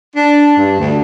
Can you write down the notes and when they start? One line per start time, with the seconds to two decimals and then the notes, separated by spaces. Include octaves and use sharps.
0.16 D4
0.58 G2
0.78 D2